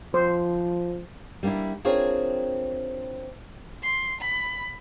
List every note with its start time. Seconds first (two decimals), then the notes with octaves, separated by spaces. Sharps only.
0.14 F3 C5
1.43 G3 A#3 C#4 D4 E4
1.85 C4 D4 F4 G#4 A#4 C#5
3.82 C6
4.20 B5